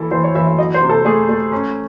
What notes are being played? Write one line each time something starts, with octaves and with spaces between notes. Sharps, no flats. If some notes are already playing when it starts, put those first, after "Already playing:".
Already playing: E3 E4 A4
E3 C5
C#5
E3 E5
E5
F#3 D#5
C5
C3
A4
A3 G#4
A3
C#4